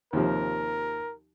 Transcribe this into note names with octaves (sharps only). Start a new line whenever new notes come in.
D#2 C3 F3 A#4